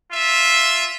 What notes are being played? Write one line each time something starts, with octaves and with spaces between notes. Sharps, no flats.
F4 E5